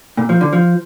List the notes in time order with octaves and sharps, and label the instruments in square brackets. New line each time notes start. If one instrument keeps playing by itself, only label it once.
[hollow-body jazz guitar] A#2
F3
D3
F3